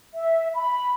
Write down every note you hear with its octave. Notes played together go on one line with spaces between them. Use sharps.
E5
B5